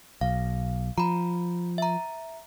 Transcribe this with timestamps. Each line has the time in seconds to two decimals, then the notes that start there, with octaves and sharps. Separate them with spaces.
0.21 B1 F5
0.98 F3 A#5 B5
1.78 E5 A#5